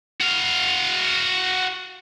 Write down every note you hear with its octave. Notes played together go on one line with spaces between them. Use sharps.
F#4 F5